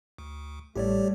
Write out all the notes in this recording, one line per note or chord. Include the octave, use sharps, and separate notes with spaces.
D2
A1 G3 A3 G4 C#5 D5